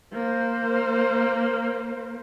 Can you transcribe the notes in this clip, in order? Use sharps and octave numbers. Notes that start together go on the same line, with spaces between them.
A#3 C5